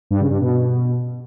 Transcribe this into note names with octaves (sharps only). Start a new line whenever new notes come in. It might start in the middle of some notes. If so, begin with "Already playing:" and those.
G2
C#3
G2
B2